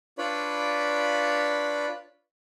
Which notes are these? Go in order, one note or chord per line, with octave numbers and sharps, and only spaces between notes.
D4 F4 B4 C#5 D5 B5